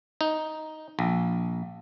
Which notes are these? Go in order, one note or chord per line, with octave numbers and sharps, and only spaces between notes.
D#4
A#1